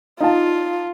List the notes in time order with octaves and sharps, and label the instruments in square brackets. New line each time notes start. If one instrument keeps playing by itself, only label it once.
[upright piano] D#4 F5 A5 [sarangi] F4